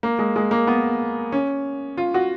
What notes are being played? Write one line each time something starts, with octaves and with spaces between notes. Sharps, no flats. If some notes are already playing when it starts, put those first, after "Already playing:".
A#3
G#3
G#3
A#3
B3
C#4
F4
F#4